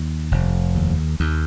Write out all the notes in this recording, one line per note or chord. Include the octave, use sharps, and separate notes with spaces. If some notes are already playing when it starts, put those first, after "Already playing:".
Already playing: D#2
F1
D#2
D#2